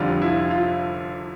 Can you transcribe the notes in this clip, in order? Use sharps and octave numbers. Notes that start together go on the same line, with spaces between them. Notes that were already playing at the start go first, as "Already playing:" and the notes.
Already playing: F1 F2 D3 G3 F4
E4
F4
F4